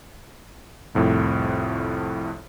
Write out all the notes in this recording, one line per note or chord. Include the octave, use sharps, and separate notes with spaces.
C2 F2 A2